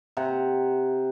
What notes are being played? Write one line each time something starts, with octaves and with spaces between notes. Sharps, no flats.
C3 F#5 A#5